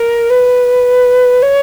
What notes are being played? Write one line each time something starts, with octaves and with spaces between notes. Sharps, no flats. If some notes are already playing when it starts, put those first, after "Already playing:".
Already playing: A#4
B4
C#5